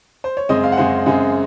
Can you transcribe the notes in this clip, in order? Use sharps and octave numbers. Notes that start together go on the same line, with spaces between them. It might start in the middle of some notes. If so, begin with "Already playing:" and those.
C5
C#5
F#2 C#3 G#3 C4 D#5
F5
F#5
F#2 C#3 G#3 C4 F5
F#2 C#3 G#3 C4